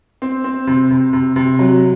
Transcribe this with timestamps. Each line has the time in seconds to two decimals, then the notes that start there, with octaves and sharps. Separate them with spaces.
0.22 C4
0.44 C4
0.67 C3
0.91 C3
1.13 C3
1.36 C3
1.59 F#3